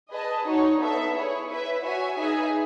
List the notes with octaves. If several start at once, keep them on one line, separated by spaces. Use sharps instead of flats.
G#4 B4 D#5 A5
D#4 F#4 C#5
B3 D#4 A4 E5
E4 G#4 C#5
E4 B4 E5
F#4 C#5 E5 G#5
D#4 G#4 B4 E5 G#5